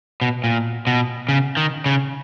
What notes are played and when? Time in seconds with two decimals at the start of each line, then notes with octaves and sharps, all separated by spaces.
0.21 B2
0.44 A#2
0.87 B2
1.29 C#3
1.57 D#3
1.86 C#3